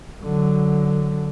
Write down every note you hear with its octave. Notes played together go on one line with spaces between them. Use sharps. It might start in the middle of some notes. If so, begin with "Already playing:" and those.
D3 F#3